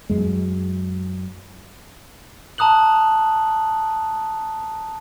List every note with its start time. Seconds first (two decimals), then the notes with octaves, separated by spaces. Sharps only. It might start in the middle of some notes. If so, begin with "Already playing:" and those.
0.10 F#2 G#3
2.58 A5 A#5 D#6 F#6 F#7